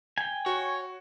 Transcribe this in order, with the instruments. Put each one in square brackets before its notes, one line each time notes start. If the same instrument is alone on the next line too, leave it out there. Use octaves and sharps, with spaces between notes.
[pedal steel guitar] G5 G#5
[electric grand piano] F#4 [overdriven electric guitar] C#5